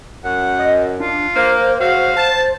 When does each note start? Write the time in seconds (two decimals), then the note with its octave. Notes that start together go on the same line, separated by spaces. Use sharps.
0.25 F#2 F#5
0.59 D#5
1.00 D4 F4
1.36 A#3 C5
1.81 C#3 F#3 F#4 F5
2.17 A5